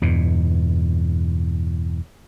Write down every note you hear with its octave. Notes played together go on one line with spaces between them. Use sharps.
E2 G2 B2